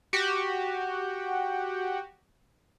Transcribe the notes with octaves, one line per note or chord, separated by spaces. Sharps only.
F#4 G4